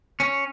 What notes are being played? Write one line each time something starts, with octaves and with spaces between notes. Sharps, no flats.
C#4